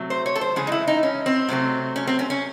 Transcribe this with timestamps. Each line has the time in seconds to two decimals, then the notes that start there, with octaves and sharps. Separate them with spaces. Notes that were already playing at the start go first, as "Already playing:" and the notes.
Already playing: C3 F#3 A3 C4
0.10 C5
0.26 C#5
0.35 A4
0.41 C5
0.56 C#3 E3 G#3 G#4
0.67 D#4
0.72 E4
0.87 D#4
1.03 C#4
1.26 C4
1.49 C3 F#3 A3 C4
1.96 C#4
2.07 C4
2.19 C#4
2.30 C#4